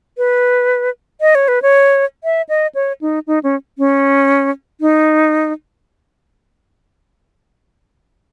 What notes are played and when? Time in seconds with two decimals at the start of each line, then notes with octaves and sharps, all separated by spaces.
0.18 B4
1.21 D#5
1.35 C#5
1.48 B4
1.62 C#5
2.24 E5
2.49 D#5
2.75 C#5
3.01 D#4
3.27 D#4
3.43 C#4
3.78 C#4
4.81 D#4